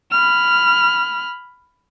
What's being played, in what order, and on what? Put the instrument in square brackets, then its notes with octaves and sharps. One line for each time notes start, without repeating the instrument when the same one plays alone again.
[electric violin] B5 F6